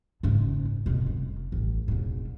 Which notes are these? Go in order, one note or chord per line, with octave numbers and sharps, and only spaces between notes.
F#1 G#2
F2 B2
F1
A1
E1 G#2